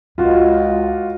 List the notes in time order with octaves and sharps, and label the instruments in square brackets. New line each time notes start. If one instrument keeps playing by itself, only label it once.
[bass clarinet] C#2 [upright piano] F4 F#4